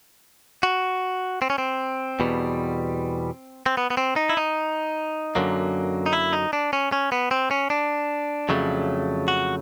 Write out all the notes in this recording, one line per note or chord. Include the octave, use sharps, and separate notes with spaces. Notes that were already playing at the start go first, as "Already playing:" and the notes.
F#4
C4
C#4
C4
E2 B2 G3
C4
B3
B3
C4
D#4
E4
D#4
F#2 D3 F#3 A#3
D#4
E4
D#4
D4
C#4
C#4
B3
C4
C#4
D4
F2 C#3 F#3 A3
F#4